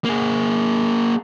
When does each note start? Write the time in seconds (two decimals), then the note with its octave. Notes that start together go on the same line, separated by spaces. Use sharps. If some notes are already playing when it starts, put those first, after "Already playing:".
0.05 A#3 G#4